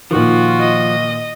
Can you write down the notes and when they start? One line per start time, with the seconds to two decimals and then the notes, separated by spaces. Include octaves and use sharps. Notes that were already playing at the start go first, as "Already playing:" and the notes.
0.11 A#2 D#3 F3 F4 F#4
0.60 D#5